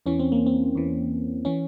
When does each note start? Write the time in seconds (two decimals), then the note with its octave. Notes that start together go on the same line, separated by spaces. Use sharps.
0.06 E2 E3 C#4
0.19 C4
0.32 A#3
0.46 C4
0.75 E2 E3
1.45 E3 C#4